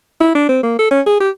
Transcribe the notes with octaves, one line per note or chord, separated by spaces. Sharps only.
E4
D4
C4
A#3
A4
C#4
G#4
G4